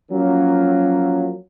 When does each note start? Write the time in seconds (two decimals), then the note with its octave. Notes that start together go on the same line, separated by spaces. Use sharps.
0.11 F3 F#3 A#3 C#4